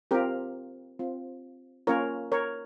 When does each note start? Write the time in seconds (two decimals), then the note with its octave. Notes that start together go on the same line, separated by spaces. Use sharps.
0.11 C4 F4 G4 A#4
0.99 C4 F4
1.87 A#3 C#4 F4 A#4 C#5
2.32 A#4 C#5